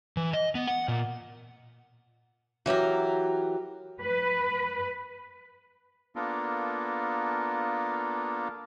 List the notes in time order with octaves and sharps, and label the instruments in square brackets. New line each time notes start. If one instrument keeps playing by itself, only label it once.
[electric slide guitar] E3
D#5
B3
F#5
A#2
[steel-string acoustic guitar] E3 F#3 G4 A#4
[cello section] B4
[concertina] A#3 B3 D4 F4 A4 A#4